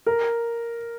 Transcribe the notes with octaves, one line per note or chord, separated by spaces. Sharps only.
A#4